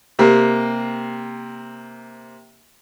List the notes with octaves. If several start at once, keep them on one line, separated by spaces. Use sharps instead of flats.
C3 A#3